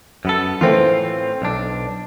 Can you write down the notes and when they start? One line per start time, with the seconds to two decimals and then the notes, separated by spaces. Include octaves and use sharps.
0.25 F#2 B3 A4
0.61 A2 E3 A3 C4 F4 C5
1.42 B1 D4